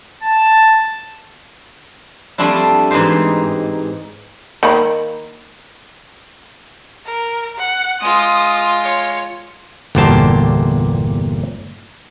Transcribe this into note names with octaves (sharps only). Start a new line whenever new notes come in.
A5
F3 G3 A3 C4 D4 E4
G#2 E3 D#4 G4 C5
D#3 A#3 B5
A#4
F#5
G#3 F4 D#6
C#5
G1 E2 A#2 G4 C5 A5